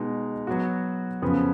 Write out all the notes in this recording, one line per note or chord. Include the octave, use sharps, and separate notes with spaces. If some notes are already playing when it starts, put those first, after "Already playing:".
Already playing: B2 G#3 D#4
F#3 B3 F#4
F2 C#3 F3 B3